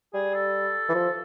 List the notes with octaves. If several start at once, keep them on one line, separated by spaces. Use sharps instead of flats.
G3 G#4
A4
E3
F3